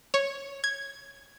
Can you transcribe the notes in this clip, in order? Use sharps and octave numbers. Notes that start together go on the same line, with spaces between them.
C#5
G#6